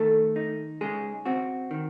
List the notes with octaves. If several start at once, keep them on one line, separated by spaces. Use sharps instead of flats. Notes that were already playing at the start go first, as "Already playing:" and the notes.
Already playing: D#3 A3 A4
D#4
C#3 G#3 G#4
C4 F#4
D#3